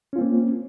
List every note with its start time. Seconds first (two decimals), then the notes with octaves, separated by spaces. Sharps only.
0.13 C#4
0.16 F4
0.18 C4
0.21 A#3